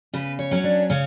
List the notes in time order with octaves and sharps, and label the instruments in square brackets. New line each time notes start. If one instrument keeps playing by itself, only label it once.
[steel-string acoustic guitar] C#3 B4
C#5
F#3 C#4
D4
C#3 C#4